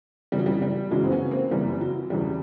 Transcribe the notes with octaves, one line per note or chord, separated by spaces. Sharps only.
F#2 C#3 E3 G3
F#3
G3
G3
F#2 C#3 E3 F#3 G#3
C4
B3 C#4
A#3 C4
F#2 C#3 E3 G3
F#3
E2 C#3 E3 G3